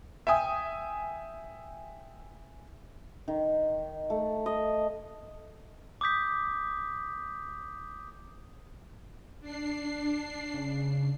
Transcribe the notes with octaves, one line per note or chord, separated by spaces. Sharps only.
E5 G5 G#5 D#6
D#3
A3
D#5
D6 D#6 G6 B6
D4 C7
C#3